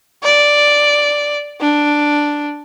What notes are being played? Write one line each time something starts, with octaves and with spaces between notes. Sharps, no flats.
D5
D4